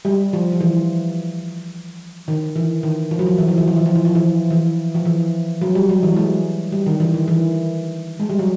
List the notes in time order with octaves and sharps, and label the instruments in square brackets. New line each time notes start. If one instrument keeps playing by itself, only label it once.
[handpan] G3
F3
F3
E3
D#3
E3
D#3
F3
F#3
F3
E3
F3
E3
F3
E3
F3
E3
F3
E3
E3
F3
E3
F#3
G3
F#3
E3
G#3
G3
D#3
E3
D#3
E3
G#3
G3
F#3